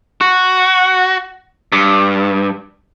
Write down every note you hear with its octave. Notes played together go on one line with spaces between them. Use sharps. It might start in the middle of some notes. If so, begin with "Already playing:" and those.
F#4
G2